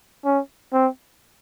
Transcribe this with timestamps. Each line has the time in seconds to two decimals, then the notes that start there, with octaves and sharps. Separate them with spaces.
0.25 C#4
0.73 C4